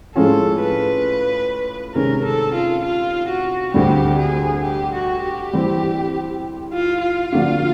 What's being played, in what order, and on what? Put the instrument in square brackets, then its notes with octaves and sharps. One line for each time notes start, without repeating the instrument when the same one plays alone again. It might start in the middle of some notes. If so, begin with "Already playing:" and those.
[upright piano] A2 F3 G#3 C#4 F4 [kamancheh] A4
[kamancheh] B4
[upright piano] C3 D#3 G#3 C#4 [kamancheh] A#4
[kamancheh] A4
F4
F4
F#4
[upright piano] D2 D3 G3 C4 [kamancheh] G4
[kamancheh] G#4
G4
F#4
G4
[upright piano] E3 G3 C4
[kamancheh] F4
F4
[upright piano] D3 F3 A#3 D4 F#4